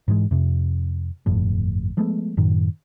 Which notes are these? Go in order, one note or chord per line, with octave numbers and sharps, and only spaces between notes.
G#2 E3 G3 G#3
F2 C3
G1 F2 A2
F3 G#3 A3 B3
F#2 A2 D#3